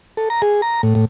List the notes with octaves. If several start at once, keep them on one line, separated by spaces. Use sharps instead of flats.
A4
A#5
G#4
A#5
A2
A2